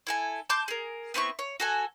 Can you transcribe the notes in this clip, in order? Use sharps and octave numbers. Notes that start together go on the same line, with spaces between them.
E4 A4 G#5
A5 C6 D6 G6
G#4 A#4
B3 C4 E4 C#6
C#5
F#4 A4 G#5